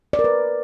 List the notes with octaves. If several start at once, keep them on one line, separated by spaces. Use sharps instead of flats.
D5
A#4
B4